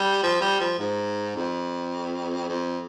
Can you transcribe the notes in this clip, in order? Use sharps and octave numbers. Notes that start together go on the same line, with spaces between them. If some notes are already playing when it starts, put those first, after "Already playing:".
Already playing: G3
F3
G3
F3
G#2
F2
F2